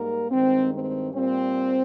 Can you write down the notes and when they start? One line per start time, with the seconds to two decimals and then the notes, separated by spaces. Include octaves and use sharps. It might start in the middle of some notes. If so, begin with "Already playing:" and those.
Already playing: G#2 G3 A#3 A#4
0.30 G2 D#3 G#3 C4
0.72 C4
1.13 A#2 G3 A#3 C4